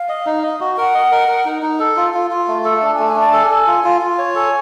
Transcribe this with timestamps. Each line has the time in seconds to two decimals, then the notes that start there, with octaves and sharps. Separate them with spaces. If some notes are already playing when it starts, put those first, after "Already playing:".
Already playing: F5
0.09 D#5
0.26 D#4
0.43 D#5
0.60 F#4
0.77 A#4 F#5
0.94 D#5
1.11 A#4
1.28 A#4
1.45 D#4
1.62 D#4
1.80 A4
1.97 F4
2.14 F4
2.31 F4
2.48 A3
2.65 A4
2.82 D4 A5
2.95 G#5
2.99 A3
3.07 G#5
3.16 D4 A5
3.33 A4 G#5
3.50 A4
3.67 F4
3.84 F4
4.01 F4
4.18 C#5
4.35 A4 G#5